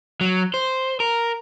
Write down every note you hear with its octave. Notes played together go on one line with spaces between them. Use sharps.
F#3
C5
A#4